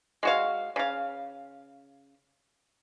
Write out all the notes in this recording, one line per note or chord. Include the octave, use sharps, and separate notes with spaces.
G#3 F#4 F5
C#3 F5